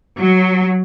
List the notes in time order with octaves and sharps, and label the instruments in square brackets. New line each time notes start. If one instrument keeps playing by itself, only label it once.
[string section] F#3